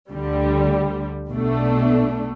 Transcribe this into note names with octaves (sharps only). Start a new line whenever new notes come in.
D2 D3 G3
B1 B2 A3 D4